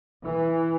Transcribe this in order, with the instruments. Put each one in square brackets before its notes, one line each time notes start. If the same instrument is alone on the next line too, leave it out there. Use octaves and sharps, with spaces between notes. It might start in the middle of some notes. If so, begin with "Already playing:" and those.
[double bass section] E3